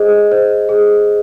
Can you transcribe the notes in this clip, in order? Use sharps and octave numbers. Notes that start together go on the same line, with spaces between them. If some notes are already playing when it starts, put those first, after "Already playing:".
Already playing: G#4 C5 D#5
C5
G#4